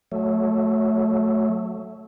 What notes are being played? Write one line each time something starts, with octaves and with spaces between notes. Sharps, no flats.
F#3 A3